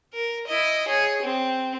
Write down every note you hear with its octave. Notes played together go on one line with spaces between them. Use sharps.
A#4
E4 D#5
G#4 C#5
C4